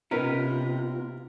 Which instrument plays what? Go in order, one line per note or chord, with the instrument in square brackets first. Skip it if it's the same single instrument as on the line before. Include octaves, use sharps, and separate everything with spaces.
[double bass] C3 [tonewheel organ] B3 F4 [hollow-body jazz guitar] C#4 D#4 B4 [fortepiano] A#4